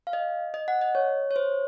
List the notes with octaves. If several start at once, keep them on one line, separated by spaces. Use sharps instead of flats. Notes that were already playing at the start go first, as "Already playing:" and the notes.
F5
D#5
D#5
F#5
D#5
C#5
C#5
C5